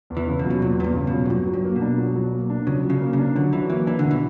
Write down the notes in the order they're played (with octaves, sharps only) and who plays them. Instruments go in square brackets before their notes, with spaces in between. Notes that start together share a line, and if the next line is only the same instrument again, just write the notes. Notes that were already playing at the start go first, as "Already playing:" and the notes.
[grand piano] E2
[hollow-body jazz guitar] E3
[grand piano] C#3
[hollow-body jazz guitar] B2
[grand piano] F#3
[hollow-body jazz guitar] B2
[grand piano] E2 [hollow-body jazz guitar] A#2
[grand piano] E2 [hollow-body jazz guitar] A#2
[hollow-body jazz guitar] G2
[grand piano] C#3
[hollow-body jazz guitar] B2
[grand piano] F#3
[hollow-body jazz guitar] A#2
[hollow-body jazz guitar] G2 [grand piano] F#3
[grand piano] F#3
[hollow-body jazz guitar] G2
[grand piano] A#3
[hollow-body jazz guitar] B2
[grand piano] D4
F#3
F#3
A#3
D4
[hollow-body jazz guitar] C#3 [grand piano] F#3
[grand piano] F#3
[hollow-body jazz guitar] C#3
[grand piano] A#3
[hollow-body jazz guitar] C#3
[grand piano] D4
[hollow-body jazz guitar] D3 [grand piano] F#3
[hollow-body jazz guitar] E3 [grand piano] F#3
[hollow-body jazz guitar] E3 [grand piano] A#3
[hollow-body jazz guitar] E3 [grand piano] D4
[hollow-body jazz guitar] D3
[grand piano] B2
[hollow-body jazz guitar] E3